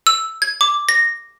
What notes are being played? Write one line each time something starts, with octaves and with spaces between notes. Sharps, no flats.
E6
G#6
D6
A#6